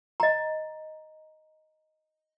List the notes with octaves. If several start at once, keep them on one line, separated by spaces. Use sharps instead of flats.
D#5 A#5